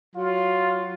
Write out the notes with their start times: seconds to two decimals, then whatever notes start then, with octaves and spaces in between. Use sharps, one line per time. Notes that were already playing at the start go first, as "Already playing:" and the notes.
0.15 F#3 F4